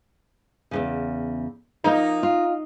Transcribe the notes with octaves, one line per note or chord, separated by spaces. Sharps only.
E2 G#2 C#3
F3 A#3 D#4
F4